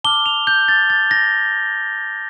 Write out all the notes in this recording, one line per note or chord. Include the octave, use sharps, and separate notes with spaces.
A5 D6 F6 G7
F7
G6
A6
A6
A#6